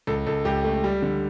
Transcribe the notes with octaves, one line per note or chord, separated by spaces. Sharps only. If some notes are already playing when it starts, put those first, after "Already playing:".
C#2 A4
C#2 A4
C#2 G4
A3
G3
D3